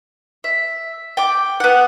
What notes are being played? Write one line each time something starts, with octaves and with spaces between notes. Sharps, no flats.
E5
G5 D6
B3 F#5